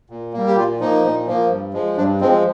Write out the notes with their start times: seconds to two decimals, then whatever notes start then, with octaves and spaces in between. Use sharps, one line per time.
0.10 A#2
0.33 G3 A#3
0.47 G4
0.56 A#2 F4
0.80 F3 A#3 D#4
1.04 A#2
1.26 F3 A#3
1.49 G2
1.73 F3 G#3
1.97 G2 D4
2.20 F3 G#3 C4